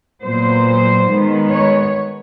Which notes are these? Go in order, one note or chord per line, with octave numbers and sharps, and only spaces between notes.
A#2 F#3 B3 C5
D#3 G#3 B3
C#5